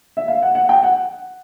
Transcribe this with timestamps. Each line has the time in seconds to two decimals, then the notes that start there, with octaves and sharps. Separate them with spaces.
0.17 E5
0.28 F5
0.42 F#5
0.55 F#5
0.69 G5
0.83 F#5